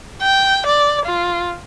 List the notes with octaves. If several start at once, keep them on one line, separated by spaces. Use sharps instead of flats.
G5
D5
F4